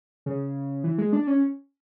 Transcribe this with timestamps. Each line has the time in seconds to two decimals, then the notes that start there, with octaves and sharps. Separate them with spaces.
0.26 C#3
0.84 E3
0.98 G#3
1.13 D4
1.27 C#4